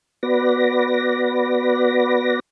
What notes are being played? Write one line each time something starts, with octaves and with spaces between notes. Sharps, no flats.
B3 F#4 B4 D5 A#6